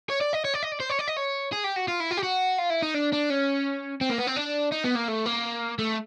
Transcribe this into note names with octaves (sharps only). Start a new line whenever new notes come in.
C#5
D5
D#5
C#5
D5
D#5
D5
C5
C#5
D5
D#5
C#5
G#4
G4
F#4
F4
E4
F4
G4
F#4
F4
E4
D#4
D4
D4
C#4
C4
A#3
B3
C4
D4
D#4
B3
A#3
A3
A#3
A3